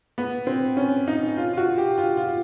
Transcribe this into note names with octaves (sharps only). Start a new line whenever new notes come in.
B3
C4
C#4
D#4
F4
F4
F#4
G4
F4
F4